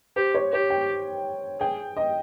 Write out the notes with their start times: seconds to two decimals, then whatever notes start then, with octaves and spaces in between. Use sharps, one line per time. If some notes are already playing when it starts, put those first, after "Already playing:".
0.16 G4 C5
0.35 C#5
0.52 G4 C#5
0.70 G5
1.60 G#4 G5
1.97 D#5